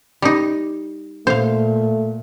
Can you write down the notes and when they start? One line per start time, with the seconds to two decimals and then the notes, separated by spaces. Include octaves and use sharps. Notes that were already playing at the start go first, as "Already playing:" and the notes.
0.22 G3 D#4
1.27 A#2 A3 C5 F5